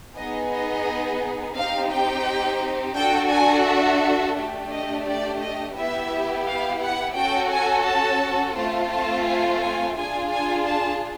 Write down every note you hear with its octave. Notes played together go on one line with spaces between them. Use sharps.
B3 D#4 G#4 D#5
D#5
C4 D#4 G4 F5
G5
D4 F#4 A4 G5
G#5
E5
A3 D4 G4
D#5
D5
D#5
B3 E4 G4 E5
F5
F#5
C#4 F#4 A4 G5
G#5
A5
A3 C4 F4 A5
A5
G#5
G#5
D4 F4 G#4 G#5
G#5
A5